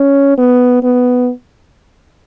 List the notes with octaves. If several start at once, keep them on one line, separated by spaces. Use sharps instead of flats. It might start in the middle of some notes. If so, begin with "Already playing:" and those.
Already playing: C#4
B3
B3